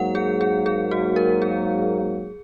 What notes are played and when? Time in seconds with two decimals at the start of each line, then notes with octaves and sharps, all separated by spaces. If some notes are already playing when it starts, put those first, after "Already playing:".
Already playing: G#2 F#3 A#3 F#5
0.15 G#4
0.41 G#4
0.66 G#4
0.91 F#4
1.16 A#4
1.42 G#4